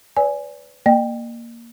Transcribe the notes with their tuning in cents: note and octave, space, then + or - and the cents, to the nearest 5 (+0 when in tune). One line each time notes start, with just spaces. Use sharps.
B4 +25 D5 -35 G#5 +0
A#3 +0 D#5 -45 G5 +0